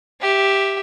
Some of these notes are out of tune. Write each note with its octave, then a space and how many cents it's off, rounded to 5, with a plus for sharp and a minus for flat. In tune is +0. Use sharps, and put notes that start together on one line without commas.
G4 +0 E5 +0